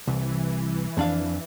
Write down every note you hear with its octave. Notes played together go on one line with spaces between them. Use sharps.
C2 E3
F2 D4 F5